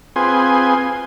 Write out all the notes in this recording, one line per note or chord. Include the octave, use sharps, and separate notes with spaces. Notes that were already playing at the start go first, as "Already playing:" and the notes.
C4 F4 G#4 B4 G#5 C6